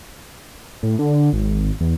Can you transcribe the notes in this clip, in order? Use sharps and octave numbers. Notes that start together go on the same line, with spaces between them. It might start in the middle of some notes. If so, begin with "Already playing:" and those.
A2
D3
G#1
E2